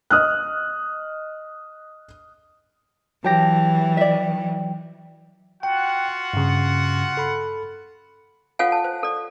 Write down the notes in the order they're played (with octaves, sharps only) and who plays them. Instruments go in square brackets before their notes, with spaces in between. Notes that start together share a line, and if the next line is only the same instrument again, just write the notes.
[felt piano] D#5 D#6 F6 F#6
[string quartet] E3 [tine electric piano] F#3 G5 A#6 [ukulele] G4 A5
[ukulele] D5 E5
[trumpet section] F4 F#4 F#5 [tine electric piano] G5
[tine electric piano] G2 C#3
A4 B5
[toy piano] F4 A4 C#5 F5 F#5 G#5
A5
C5
A4 D5